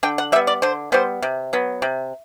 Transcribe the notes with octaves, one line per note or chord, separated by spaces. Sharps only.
D3 G5
F#5
G3 B3 E5
D5
D3 C5
G3 B3 C5
C3
F#3 B3
C3